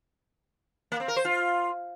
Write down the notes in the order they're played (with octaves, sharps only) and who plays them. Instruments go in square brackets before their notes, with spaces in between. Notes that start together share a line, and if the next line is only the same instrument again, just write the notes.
[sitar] A#3
C4
A#4
C5
F4